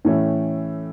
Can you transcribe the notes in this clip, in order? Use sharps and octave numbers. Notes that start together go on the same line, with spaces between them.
A2 E3 A3 C#4